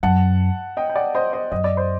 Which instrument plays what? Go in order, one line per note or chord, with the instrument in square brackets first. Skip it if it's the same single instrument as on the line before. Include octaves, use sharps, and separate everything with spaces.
[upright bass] F#2 [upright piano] F#5 A5
[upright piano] D#5 G5
G5
D5 F#5
C5 D#5
C5 D#5
[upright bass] F#2 [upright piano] D#5
[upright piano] D5
C5